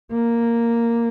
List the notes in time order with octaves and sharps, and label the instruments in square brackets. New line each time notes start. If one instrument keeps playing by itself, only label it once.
[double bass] A#3